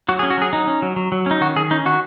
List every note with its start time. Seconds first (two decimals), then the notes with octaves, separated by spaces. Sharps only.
0.09 F#3 F#4
0.19 G#4
0.23 C#4
0.30 F#4
0.37 F#3 G#4
0.53 F#3 D#4
0.68 C#4
0.82 F#3
0.96 F#3
1.12 F#3
1.26 C#4 D#4
1.41 D#3 F#4
1.56 D#3 G#4
1.71 C#4 D#4
1.86 D#3 F#4